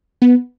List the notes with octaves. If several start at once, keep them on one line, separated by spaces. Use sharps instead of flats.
B3